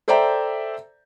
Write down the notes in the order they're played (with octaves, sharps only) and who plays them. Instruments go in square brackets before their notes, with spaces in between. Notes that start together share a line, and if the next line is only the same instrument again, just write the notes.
[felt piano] A4 C5 D5 E5 G5 A#5